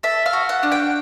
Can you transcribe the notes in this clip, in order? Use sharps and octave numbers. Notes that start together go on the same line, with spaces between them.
A4 E5
F5
F#4
F#5
D4
G5